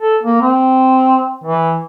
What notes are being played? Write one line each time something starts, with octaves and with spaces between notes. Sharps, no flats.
A4
A#3
C4
E3